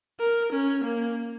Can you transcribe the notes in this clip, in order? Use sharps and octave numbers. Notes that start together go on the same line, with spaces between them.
A#4
C#4
A#3